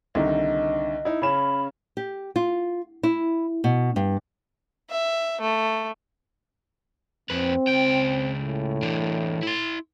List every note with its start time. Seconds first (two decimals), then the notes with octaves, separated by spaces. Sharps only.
0.15 C2 D3 D#3 D#5
1.05 D#4 E4
1.22 C#3 C#4 B5 E7
1.97 G4
2.36 F4
3.03 E4
3.64 B2
3.96 G2
4.90 E5
5.41 A3
7.30 F2 C4 B4
7.67 C#2 G5
8.40 A2
8.83 E3 D4
9.43 E4 C6